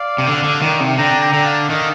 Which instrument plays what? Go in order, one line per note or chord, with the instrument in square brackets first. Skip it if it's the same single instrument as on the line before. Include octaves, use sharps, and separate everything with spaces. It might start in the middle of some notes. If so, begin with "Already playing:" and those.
Already playing: [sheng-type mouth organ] D5 F5
[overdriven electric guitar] C3
D3
D3
D#3
C3
[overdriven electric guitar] D3 [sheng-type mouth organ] G5 A#5
[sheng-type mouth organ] G5 A#5
[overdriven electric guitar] D3
[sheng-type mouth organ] F5 A5
[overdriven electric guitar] D#3